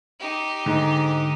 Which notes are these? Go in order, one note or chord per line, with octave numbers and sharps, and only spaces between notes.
D#4 G4
G#2 D3